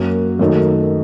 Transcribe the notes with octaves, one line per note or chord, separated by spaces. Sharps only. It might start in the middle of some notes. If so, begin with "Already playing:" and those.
Already playing: F#2 F#3 A#3 F#4
F#2 D#3 F#3 A3 D#4